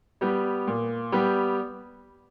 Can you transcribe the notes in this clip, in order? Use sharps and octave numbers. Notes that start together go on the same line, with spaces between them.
G3 B3 G4
A#2
G3 B3 G4